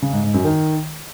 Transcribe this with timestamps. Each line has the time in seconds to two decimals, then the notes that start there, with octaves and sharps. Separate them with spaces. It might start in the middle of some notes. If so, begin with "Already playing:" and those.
0.02 C#3
0.13 G#2
0.23 G#2
0.34 F#2
0.45 D#3